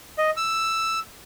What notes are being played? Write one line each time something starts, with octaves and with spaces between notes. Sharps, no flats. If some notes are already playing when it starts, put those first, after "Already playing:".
D#5
E6